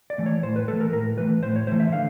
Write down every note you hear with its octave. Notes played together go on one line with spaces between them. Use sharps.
D5
E3 A3
C#5
A2 C5
B4
E3 A3 A4
A#4
A2 A#4
E3 A3 B4
A2 C5
C#5
E3 A3 C5
E5
D3 F5